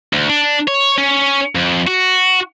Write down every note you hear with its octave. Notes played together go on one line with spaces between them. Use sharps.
D2
D4
C#5
C#4
F2
F#4